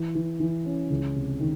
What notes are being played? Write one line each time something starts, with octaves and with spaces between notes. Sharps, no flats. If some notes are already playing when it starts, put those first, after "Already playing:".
Already playing: E3
E3
E3
C#4
C#2
C3
D#3